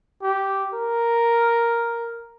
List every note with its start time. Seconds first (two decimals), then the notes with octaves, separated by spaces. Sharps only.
0.23 G4
0.74 A#4